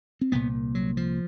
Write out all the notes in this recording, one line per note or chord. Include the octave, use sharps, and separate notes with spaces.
C4
C2 A#2 B3
F#3
F3